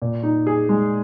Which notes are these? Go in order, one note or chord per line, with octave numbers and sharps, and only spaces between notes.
A#2
D#4
G#4
G#3